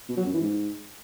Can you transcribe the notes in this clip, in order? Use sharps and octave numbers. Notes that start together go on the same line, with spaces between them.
B2
F#3
F#2
E3
G#2